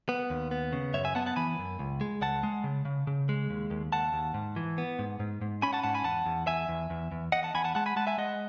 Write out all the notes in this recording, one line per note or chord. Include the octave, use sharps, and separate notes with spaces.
B3
D#2
B3
C#3
F#2 C#5 E5
E5 G#5
B3 F#5 A5
F#5 A5
E3 G#5 B5
F#2
C#2
G#3
C#2 F#5 A5
G#3
C#3
C#3
C#3
G#3
D#2
D#2
D#2 F#5 A5
D#2
G#2
E3
B3
G#2
G#2
G#2
C#4 G#5 B5
F#5 A5
G#2 F#5 A5
G#5 B5
E2 F#5 A5
E2
E2 E5 G#5
E2
E2
E2
E2 D#5 F#5
F#5 A5
E2 G#5 B5
F#5 A5
G#3 F#5 A5
G#5 B5
G#3 F#5 A5
E5 G#5
G#3 D#5 F#5